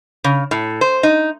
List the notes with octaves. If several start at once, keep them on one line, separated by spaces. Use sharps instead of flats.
C#3
A2
C5
D#4